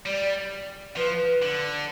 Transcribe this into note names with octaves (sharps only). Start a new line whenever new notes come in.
G3 D5
F3 B4
D3